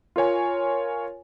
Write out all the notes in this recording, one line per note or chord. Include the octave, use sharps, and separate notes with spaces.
F4 A#4 C#5 G#5